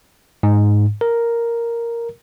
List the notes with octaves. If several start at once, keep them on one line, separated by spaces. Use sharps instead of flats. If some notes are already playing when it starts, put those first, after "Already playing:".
G#2
A#4